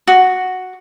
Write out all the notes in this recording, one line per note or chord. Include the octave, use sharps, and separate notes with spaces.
F#4